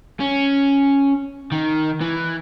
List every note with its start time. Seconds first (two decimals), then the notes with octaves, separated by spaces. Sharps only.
0.20 C#4
1.52 D#3
2.01 E3